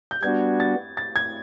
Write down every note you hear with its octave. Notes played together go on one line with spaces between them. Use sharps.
G6
G3 B3 D4 F#4 G#6
A6
A6
G#6